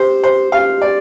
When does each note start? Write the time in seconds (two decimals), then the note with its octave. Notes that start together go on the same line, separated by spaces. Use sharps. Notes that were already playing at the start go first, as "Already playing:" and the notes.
Already playing: G4 C5
0.24 C5
0.52 G4 F5
0.82 D5